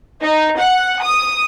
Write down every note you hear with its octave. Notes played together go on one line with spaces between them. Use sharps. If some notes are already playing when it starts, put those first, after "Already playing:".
D#4
F#5
D#6